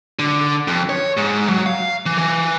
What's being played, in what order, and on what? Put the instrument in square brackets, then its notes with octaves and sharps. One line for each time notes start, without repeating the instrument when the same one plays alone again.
[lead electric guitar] D3
F2
C#5
G#2
F#3
F5
E3
E3